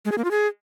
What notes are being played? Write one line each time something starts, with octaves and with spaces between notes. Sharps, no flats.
G#3
G#4
A#3
F4
G#4